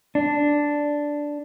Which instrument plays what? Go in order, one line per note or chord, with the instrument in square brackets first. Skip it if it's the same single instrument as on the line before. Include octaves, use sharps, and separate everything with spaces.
[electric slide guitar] D4